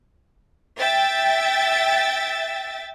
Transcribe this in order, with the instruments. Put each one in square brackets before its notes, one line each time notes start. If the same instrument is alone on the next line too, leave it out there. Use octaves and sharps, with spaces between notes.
[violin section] E5 G5 A6